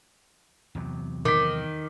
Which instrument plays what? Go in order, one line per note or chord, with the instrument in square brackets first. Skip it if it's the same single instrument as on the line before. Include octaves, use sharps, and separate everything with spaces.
[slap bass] E2 C3 F#3
[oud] D#3 [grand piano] D6 B6